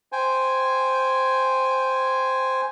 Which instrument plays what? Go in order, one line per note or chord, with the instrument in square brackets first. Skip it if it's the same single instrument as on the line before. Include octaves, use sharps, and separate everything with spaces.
[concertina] C5 G5 G#5